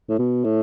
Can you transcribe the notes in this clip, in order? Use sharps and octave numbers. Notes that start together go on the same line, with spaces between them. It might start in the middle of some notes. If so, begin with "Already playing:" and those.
A2
B2
A2